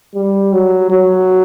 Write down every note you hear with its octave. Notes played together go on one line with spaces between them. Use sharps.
G3
F#3
F#3